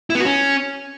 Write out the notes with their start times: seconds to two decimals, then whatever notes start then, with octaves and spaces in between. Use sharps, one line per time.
0.10 E4
0.15 B3
0.20 F#4
0.25 C#4